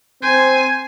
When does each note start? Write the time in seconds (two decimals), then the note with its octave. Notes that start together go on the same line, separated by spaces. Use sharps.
0.23 C4 C5 G#5